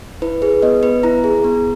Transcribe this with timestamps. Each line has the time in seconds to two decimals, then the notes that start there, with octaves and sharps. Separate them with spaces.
0.22 E4 B4
0.42 G#4 B4
0.63 B3 D#5
0.83 B3 B4
1.03 E4 A#5
1.24 G#4
1.44 B3